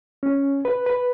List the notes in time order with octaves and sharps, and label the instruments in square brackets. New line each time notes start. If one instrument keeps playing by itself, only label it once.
[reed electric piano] C#4
B4
B4